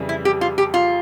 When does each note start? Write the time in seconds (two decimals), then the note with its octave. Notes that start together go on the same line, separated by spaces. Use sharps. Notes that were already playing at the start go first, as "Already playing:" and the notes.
Already playing: F2 C#3 E3 G3
0.09 E4
0.25 G4
0.41 F4
0.58 G4
0.74 F4